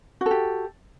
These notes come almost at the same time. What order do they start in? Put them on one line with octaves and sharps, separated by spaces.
F#4 A4 G4